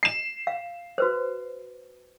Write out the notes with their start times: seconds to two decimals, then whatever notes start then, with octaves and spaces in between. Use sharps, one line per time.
0.03 C7 E7
0.47 F5
0.98 F#4 B4 C5